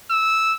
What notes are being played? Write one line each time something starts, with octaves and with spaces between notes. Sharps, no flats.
E6